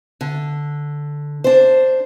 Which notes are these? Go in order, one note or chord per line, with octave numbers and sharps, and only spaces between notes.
D3
D4 C5